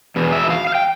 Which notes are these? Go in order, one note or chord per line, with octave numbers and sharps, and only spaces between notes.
E2 B2
E5
F5
F5
G5